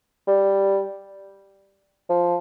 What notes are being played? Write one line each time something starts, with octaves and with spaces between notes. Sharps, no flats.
G3
F3